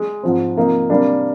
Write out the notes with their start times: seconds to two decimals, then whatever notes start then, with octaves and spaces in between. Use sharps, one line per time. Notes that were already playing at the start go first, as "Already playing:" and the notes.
Already playing: G#3
0.23 G#2 F3 C4
0.56 C3 F3 A#3 D#4
0.90 C3 G3 A#3 D4 A#4